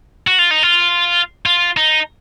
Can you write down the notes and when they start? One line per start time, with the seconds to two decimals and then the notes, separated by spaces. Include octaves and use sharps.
0.27 F#4
0.39 F4
0.51 D#4
0.63 F4
1.46 F4
1.77 D#4